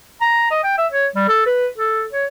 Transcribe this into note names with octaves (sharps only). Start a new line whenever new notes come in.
A#5
D#5
G5
E5
C#5
G3
A4
B4
A4
C#5